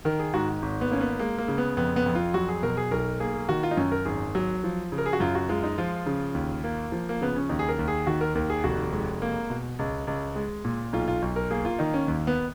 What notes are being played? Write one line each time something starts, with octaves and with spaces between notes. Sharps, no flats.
D#3 A#4
G#4
G#2 F#4
G#1
B3
A#3 C#4
B3
G#3 A#3
A#3
C#3
B3
F2 B3
B3
F2
F4
F#3 F#4
G#4
B2 A#4
G#4
B1 A#4
A#3 G#4
D#3 F#4
F4
D#4
F#2 C#4
A#4
G#1 G#4
F#3
F3
C#3
A#4
G#4
F#4
F#2 F4
F#4
G#3 F4
D#4
F3 F4
C#3
D#2
A#3
F3
A#3
C#3 B3
C#4
D#2 D#4
G#4
A#4
D#2
G#4
D#3 F#4
A#4
D#2 A#4
G#4
F1 F#4
G#3
A#3
B2
C#2
C#2
G#3
A#2
B1 F4
F4
B1
A#4
A#3 G#4
F4
D#3 D#4
C#4
D#2
B3